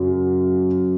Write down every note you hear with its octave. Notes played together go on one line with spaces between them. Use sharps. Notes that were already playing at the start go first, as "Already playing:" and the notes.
Already playing: F#2 C#3 F#3 C#4